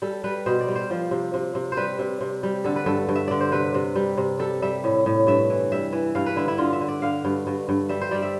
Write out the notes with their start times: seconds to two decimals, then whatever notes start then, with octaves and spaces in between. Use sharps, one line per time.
0.02 G3 A4
0.24 G3 B4
0.46 B2 C5
0.61 D5
0.68 G3
0.76 C5
0.91 F3
1.11 C3
1.34 C3
1.55 C3
1.72 C5
1.77 G3 B4
1.99 C3
2.21 C3
2.43 G3
2.64 D3 A4
2.76 B4
2.86 G2 A4
3.09 G2
3.16 E5
3.28 D3 D5
3.41 C5
3.52 C3 B4
3.74 C3
3.96 G3
4.17 C3
4.39 G3 A4
4.62 G3 E5
4.84 A2
5.06 A2
5.27 G2 E5
5.50 E3
5.72 G3 E5
5.93 E3
6.15 G2 F5
6.26 B4
6.36 D3 E4
6.48 E4
6.58 D3 F4
6.73 E5
6.81 D3
6.88 D5
7.02 D3 F5
7.25 G2
7.47 G2
7.69 G2
7.89 G3 E5
8.01 C5
8.11 G3 D5
8.22 E5